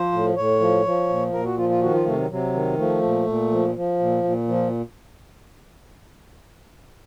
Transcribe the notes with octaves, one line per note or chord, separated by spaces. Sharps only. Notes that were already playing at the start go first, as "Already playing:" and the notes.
Already playing: F3 C5
A2
A2 C#5
F3
F3
A#2
A#2 A#4
F#4
F3 F4
F4
D#3 F#4
F4
C3 A3
F#3
C3 F#3
D#3
F3 A3
A#2
A#2
F3
F3
A#2
A#2
F3